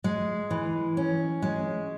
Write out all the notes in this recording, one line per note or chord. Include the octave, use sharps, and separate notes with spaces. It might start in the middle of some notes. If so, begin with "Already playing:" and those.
G#3
E3
C#4
G#3